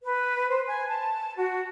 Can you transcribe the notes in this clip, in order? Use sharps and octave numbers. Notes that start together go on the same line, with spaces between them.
B4
C5
G#5
A5
F#4